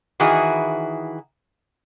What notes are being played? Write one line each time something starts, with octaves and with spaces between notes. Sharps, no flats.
D#3 E3 E4 F#4 G#4